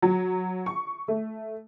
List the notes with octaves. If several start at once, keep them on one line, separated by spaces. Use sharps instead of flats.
F#3
C#6
A3